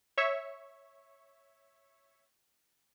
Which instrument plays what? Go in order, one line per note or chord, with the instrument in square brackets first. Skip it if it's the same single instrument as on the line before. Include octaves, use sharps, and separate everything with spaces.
[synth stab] C#5 E5 C#6